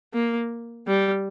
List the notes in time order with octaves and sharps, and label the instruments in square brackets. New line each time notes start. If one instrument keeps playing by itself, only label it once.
[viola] A#3
G3